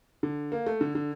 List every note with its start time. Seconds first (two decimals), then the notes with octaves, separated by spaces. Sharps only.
0.23 D3
0.52 A#3
0.67 A3
0.81 D3
0.95 D3